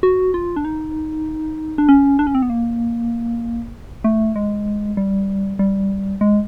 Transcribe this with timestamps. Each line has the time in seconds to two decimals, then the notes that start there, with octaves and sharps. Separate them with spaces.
0.03 F#4
0.34 F4
0.56 D4
0.65 D#4
1.78 D4
1.89 C#4
2.19 D4
2.27 C#4
2.35 C4
2.42 B3
2.50 A#3
4.04 A3
4.36 G#3
4.97 G3
5.59 G3
6.21 G#3